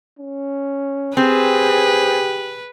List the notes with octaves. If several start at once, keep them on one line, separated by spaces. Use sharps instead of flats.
C#4
C4 G4 G#4 B4